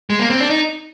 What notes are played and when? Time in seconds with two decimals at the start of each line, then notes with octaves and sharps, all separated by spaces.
0.10 G#3
0.19 A#3
0.30 C4
0.40 D4
0.50 D#4